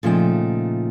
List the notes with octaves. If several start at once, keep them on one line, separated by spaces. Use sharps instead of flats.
A#2 C#3 F3 A3 D#4 G5